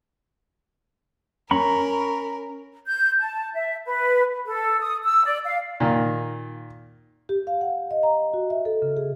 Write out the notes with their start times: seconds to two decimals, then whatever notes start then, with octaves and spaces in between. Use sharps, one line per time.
1.51 C#4 A#4 A#5 B5 C#6
2.87 G6
3.19 A5
3.55 E5
3.86 B4
4.46 A4
4.80 D#6
5.04 E6
5.25 D5
5.45 F5
5.80 A#2 D#3
7.29 G4
7.47 F5
7.61 F#5
7.91 D#5
8.03 A#5
8.34 F#4
8.50 E5
8.65 A4
8.82 C#3
8.97 G#4